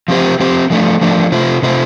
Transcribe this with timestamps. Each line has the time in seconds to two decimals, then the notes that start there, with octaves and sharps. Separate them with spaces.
0.08 F3 C4 G4 C5
0.40 F3 C4 G4 C5
0.70 F3 A3 D4
1.01 F3 A3 D4
1.32 C3 A3 F4 C5
1.62 C3 A3 F4 C5